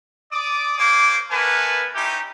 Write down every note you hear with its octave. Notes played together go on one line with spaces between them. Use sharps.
D5 D6 D#6
A#3 C5 C#5 G#5 D6
A3 B3 A#4 B4 G#5 A5
C#4 D#4 E4 G4